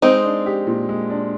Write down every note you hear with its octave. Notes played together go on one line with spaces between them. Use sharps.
G#3 C4 D#4
D4
G4
A#2
G#3
D4